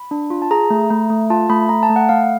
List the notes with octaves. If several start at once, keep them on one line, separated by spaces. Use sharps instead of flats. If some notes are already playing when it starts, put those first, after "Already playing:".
Already playing: B5
D4
F4
A5
G#4 A#5
A3
A3
A3
F4 A5
A3 B5
A3 A#5
A5
A3
F#5
A3 F5